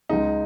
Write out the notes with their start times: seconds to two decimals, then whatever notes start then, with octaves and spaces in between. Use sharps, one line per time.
0.09 C#2 C#3 G#3 D#4